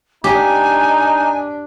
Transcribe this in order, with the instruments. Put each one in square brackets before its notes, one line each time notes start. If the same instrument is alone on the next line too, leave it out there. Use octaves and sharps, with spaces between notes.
[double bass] D4 [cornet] D#4 [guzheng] G4 [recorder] G#5